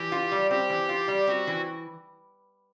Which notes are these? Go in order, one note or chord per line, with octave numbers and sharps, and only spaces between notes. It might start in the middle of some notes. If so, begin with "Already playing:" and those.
Already playing: E3 G4
F4
G3
C4 G4
E3
F4
G3
C4 F#4
E3